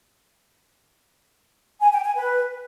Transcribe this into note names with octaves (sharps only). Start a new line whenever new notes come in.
G#5
G5
G#5
B4